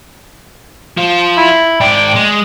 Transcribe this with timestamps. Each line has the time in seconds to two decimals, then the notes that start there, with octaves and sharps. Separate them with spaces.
0.97 F3
1.37 E4
1.80 G#2 D5 G5
2.16 G#3